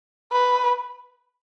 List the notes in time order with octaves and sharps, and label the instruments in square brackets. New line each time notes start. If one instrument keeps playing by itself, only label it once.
[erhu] B4